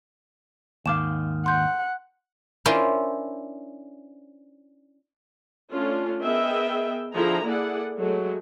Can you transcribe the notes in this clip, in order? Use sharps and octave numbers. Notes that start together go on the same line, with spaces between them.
D#2 G#2 D#3 F5 D6 E7
F#5 C6 G6
C#4 D4 E4 F4 A#4 C5
A3 C#4 D4 F4
B3 G#4 A#4 D#5 E5 G5
D3 F3 E4 G#4 A#5
A#3 E4 G#4 A4 D5 F#5
F#3 G#3 A3 F#4